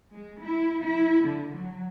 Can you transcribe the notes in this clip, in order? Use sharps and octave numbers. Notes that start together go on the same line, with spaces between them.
G#3
E4
E4
D3
F#3